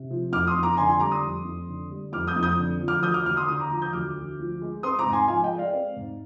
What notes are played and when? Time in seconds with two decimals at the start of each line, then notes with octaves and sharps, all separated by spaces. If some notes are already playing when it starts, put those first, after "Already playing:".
Already playing: C3
0.11 F3
0.32 F2 D6 F6
0.47 C6 D#6
0.55 F2
0.63 A#5 D6
0.77 D3 G#5 C6
0.88 G#5 C6
1.00 G3 A#5 D6
1.11 C6 D#6
1.23 F2
1.45 F2
1.68 D3
1.91 G3
2.12 F2 D6 F6
2.27 D#6 G6
2.36 F2
2.43 D#6 G6
2.58 D3
2.81 F3
2.88 D6 F6
3.02 D2 D#6 G6
3.14 D6 F6
3.25 D2 D6 F6
3.36 C6 D#6
3.48 D3 C6 D#6
3.59 A#5 D6
3.71 F3 A#5 D6
3.82 D#6 G6
3.93 D2 D6 F6
4.16 D2
4.39 F3
4.62 G#3
4.83 C4 C6 D#6
4.99 A#5 D6
5.06 G#2
5.13 G#5 C6
5.28 F3 F5 G#5
5.43 D#5 G5
5.52 G#3
5.58 D5 F5
5.73 C4
5.96 G#2